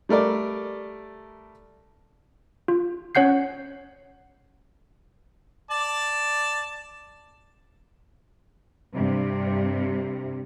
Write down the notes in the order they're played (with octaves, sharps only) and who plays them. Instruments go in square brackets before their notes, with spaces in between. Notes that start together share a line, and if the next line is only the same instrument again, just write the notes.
[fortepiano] G3 A3 A#4 D5
[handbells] F4
C#4 C#5 F#5 G6 C7
[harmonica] D5 A5
[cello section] G2 C3